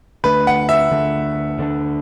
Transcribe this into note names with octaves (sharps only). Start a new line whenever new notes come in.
D2 D3 A3 D4 B4
F#5
E5
D2 D3 A3 D4
D2 D3 A3 D4